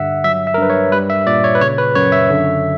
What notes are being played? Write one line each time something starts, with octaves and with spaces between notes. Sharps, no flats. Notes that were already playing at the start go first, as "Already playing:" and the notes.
Already playing: G2 D3 E5 F#5
F#3 E5
E5
A#4
G2 B4
C#5
G3 B4
E5
A#2 D5
C#5
B4
C#3 C#5
B4
F#2 C#5
E5
D3